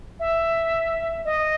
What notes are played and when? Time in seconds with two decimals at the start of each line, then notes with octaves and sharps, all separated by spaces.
0.20 E5
1.25 D#5